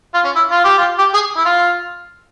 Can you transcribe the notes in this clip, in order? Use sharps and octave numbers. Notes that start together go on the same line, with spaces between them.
F4
C#4
E4
F4
G4
F4
G4
G#4
E4
F4